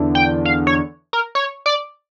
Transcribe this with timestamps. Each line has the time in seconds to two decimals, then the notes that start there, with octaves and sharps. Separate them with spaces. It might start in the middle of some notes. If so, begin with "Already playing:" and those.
Already playing: E2 D3
0.15 G5
0.45 F5
0.67 C#5
1.13 A#4
1.35 C#5
1.66 D5